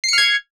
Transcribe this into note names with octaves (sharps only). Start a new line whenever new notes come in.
F6 G#6 C7 C#7